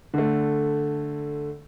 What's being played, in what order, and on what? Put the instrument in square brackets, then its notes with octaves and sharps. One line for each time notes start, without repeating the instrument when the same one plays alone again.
[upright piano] D3 A3